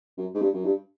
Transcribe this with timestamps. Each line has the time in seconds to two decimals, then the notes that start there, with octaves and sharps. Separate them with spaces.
0.18 F#2
0.35 G#2
0.41 G2
0.54 F#2
0.65 G2